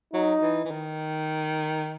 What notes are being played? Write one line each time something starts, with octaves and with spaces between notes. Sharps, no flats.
F#3 D#4
E3
E3
D#3